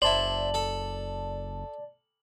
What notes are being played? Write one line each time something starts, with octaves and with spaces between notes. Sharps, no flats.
F#1 E4 C5 D5 A5 F#7
A4